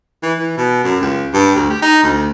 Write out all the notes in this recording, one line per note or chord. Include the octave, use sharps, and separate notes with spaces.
E3
E3
B2
F#2
C#2
G2
D2
G4
D#4
D2